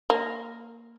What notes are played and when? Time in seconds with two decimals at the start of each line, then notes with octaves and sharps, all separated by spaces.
0.10 A#3